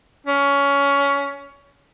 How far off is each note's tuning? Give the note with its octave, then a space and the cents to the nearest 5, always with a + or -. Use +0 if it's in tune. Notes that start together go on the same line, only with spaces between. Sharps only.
C#4 +20